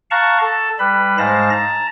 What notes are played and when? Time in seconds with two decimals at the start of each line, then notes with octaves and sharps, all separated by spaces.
0.11 F5 F#5 A5 A#5 C#6
0.40 A4 A5
0.79 G3 B4 B5
1.18 G#2 G#3 C5 F5 A5 A#6
1.51 A5 A#5